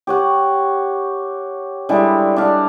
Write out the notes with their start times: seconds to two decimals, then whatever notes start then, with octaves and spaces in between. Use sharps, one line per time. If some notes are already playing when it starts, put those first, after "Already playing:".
0.07 G4 C#5 F#5
1.89 D3 G3 G#3 E4
2.36 D4 F5